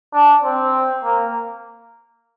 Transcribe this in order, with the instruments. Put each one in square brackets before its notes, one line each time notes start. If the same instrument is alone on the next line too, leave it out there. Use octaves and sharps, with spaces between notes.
[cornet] D4
C4
A#3